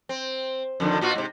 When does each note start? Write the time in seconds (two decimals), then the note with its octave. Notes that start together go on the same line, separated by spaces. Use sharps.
0.09 C4
0.80 F2 D3 D#3
1.01 A#2 F4 F#4
1.15 G#2 C3